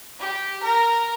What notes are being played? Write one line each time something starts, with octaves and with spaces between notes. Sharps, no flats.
G4
A#4